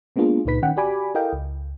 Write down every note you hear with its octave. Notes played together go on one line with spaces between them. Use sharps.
G#3 A#3 B3 D4 F4 G#4
C#2 A#2 D#4 B4 B6
D#3 C#4 F#5 G5
F#4 G4 D5 G#5 B5 D6
E4 A4 A#4 D#5 F5 G5
C#2